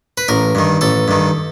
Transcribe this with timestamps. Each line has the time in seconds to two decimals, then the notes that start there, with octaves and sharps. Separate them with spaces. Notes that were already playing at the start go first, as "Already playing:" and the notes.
0.18 B4
0.28 A1 A#4
0.55 G2 D#3
0.81 A1 A4
1.08 G2 D#3